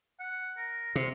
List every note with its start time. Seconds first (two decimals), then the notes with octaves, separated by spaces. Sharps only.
0.20 F#5
0.57 A#4
0.96 C3